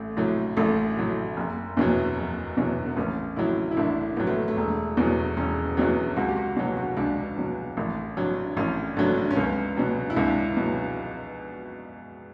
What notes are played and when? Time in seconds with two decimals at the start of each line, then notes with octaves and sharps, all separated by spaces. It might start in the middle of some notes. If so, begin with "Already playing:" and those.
Already playing: A1 A3
0.17 A2 F#3
0.57 A1 A3
0.97 A2 F#3
1.37 F#1
1.77 E2 B2 F#3
2.17 F#1
2.57 E2 B2 F#3
2.87 B3
2.97 A1 C#4
3.37 A2 F#3 E4
3.71 E4
3.77 A1 D4
4.17 A2 F#3 B3
4.27 A3
4.48 A3
4.57 E1
4.97 E2 B2 F#3
5.37 E1 C#4
5.77 E2 B2 F#3
6.16 C#2 F#4
6.28 G4
6.36 F#4
6.57 B2 F#3 F#4
6.77 F#4
6.97 C#2 D4
7.37 B2 F#3
7.77 A1
8.17 G2 F#3
8.57 A1 C#4
8.97 G2 F#3 A3
9.31 C#4
9.37 C#2 B3
9.77 B2 F#3
10.10 E4
10.16 C#2 D4
10.57 B2 F#3